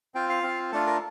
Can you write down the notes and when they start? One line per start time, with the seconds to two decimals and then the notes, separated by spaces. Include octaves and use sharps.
0.14 C4 F4 G5
0.29 F5
0.43 C4 F4
0.72 A3 D4 F4 A4
0.87 A#4